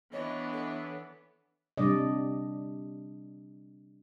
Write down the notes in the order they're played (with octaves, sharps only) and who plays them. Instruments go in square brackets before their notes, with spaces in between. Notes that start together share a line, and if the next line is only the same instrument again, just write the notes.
[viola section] E3 B3 D4 [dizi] C#5 [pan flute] D#5
[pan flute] A4
[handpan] C3 G3 D4 D5 D#5